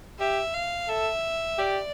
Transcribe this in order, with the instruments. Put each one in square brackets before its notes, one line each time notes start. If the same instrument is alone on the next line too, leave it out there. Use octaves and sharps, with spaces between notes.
[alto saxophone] G4 [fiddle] E5
[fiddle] F5
[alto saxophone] A4 [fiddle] E5
[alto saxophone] G4 [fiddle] D5